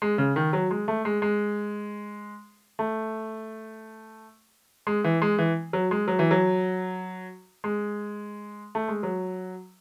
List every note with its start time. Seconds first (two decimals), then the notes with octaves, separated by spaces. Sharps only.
0.02 G#3
0.18 C#3
0.36 D#3
0.53 F#3
0.71 G#3
0.88 A3
1.05 G#3
1.22 G#3
2.79 A3
4.87 G#3
5.04 E3
5.22 G#3
5.38 E3
5.73 F#3
5.91 G#3
6.08 F#3
6.19 E3
6.31 F#3
7.64 G#3
8.75 A3
8.88 G#3
9.03 F#3